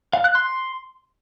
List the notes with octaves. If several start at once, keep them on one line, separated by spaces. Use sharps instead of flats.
F5
F#6
C6